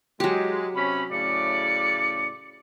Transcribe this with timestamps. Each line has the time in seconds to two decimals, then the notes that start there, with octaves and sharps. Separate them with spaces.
0.20 F#3 G#3 G4
0.75 C3 C#4 B5
1.12 A2 C#3 D5 C#7